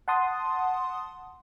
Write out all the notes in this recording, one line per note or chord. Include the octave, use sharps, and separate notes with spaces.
F#5 A5 C6 D#6